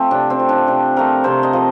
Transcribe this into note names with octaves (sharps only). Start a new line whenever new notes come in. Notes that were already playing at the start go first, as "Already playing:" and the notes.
Already playing: F3 A3 C4
C3 D4
C4
F3 A3
D4
C3 D4
F3 A3 A#4
C3 C5
D#5
F3 A3